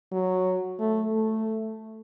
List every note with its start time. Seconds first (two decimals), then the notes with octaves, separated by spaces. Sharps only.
0.12 F#3
0.79 A3
1.12 A3